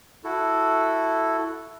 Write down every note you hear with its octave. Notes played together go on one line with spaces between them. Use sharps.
E4 F#4 A4